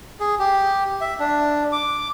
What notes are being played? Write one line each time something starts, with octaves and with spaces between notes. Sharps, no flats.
G#4
G4
E5
D4
D6